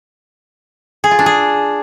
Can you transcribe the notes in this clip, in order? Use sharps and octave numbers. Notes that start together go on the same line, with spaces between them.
G#4
F4
D4
G#4